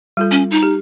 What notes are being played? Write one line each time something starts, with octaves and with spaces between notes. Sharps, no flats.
G3 F4 A4
C#4
D#4
G4